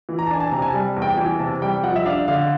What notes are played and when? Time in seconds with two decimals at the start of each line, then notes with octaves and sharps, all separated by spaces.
0.09 E3
0.19 A#5
0.27 A5
0.30 D4 G#5
0.40 A5
0.52 C3 A#5
0.62 G#5
0.68 A5
0.74 G3
0.96 E2
1.02 G5
1.17 E3 G#5
1.39 C3 A5
1.62 G3 G5
1.83 F3 F#5
1.96 E5
2.06 D4 F5
2.28 D3 F5